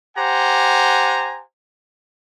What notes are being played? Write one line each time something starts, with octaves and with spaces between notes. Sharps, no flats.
G4 C5 F#5 G#5 A#5